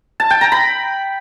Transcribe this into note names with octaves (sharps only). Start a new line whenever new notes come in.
A5
G5
A#5
B5